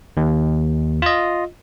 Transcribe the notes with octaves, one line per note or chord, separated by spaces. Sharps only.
D#2
F4 D#5